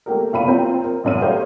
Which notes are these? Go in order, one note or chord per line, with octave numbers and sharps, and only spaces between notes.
A3 A#3 G4 A#4
F#1 F5 B5 D#7
C4 F4 G4 C5 A#5
A#4
A1 F#2 D#7
G3 A3 G4 C5 C#5 F5